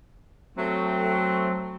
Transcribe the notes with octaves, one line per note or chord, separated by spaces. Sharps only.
F#3 A3 C4